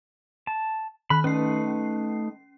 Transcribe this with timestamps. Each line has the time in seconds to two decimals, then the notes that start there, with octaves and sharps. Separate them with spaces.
0.47 A5
1.10 D#3 B5 F#6
1.24 A3 C#4 D#4 B4 C7